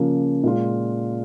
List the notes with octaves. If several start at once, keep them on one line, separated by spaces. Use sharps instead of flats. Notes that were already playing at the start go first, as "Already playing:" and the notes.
Already playing: C#3 F3 A#3 C#4
A#2 G#3 F4